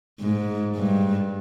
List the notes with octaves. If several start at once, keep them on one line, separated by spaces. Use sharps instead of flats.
G#2
G2